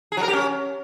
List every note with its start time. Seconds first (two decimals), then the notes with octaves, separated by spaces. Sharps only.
0.12 G#4
0.17 F#3
0.23 A#4
0.28 G4
0.33 C#4